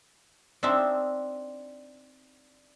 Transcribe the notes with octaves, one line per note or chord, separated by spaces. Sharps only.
C4 D4 D#4 E5